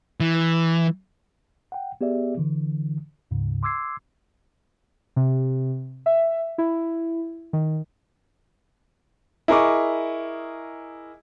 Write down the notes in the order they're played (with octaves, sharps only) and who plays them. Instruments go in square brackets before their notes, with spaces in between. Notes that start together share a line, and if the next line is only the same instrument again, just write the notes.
[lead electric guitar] E3
[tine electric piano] F#5 G5
B3 G4 G#4 D5 E5
D3 E3
D2 G#2 C#3
C6 D6 E6 G#6 C7
[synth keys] C3
E5
E4
D#3
[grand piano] E4 G#4 A#4 D#5 C#6 D6